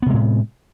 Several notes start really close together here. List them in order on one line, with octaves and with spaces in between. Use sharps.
B3 C3 G#3 A2